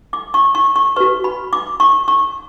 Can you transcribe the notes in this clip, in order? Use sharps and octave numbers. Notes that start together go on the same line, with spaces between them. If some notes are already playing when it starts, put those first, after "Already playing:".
D6
C#6
C#6
C#6
F#4 B4 C#6
B5
D6
C#6
C#6